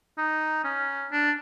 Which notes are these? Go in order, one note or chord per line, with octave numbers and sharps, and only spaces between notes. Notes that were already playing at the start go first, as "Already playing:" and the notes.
D#4
C#4
D4